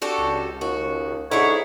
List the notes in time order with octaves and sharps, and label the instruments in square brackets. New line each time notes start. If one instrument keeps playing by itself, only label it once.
[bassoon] D4 [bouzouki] F#4 G4 A4
[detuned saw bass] C#2
[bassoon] D#2 [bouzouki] F#4
[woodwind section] G#2 C#5 [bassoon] D3 [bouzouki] E4 G#4